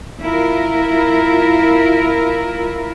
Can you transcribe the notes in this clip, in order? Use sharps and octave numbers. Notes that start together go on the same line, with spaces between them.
E4 F4 A#4